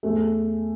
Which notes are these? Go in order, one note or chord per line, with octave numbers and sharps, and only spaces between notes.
E2 A3